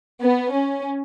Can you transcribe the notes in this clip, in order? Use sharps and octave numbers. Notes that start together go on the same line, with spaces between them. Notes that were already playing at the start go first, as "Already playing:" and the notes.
B3
C#4